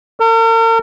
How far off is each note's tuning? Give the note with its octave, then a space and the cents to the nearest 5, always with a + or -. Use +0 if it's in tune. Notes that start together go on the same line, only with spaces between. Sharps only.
A#4 -45